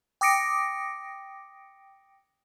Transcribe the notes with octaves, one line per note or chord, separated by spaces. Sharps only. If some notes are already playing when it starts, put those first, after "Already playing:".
G5 D6 D#6 A#6 C#7 D7